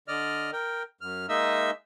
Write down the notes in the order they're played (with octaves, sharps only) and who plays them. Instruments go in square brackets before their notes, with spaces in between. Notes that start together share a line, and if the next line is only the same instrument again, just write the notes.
[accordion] D3 D5 D#5 F6
A#4 G5
F#2 F6
G#3 A#3 D#4 D#5 E5 E6